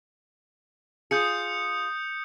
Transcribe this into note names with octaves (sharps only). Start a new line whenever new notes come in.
F4 G#4 D#6 G6 C#7